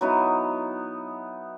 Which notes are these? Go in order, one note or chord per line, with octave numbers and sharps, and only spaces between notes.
F#3 B3 D#4 E4